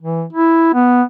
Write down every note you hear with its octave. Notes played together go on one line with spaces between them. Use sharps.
E3
E4
B3